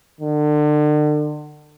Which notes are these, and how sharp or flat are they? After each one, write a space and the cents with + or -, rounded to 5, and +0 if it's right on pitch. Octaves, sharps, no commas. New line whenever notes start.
D3 +35